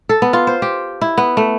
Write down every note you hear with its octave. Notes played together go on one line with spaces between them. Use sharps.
A4
B3
F4
C5
G4
E4
B3
A3